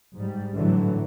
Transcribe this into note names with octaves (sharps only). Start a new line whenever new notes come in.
G#2 G3
A2 D3 E3 F#3